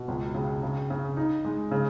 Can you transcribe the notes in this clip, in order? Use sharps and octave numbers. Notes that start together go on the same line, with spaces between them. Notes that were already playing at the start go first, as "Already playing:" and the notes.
Already playing: B2
C#2
C#3
C#3
C#3
D#4
G#3
C#3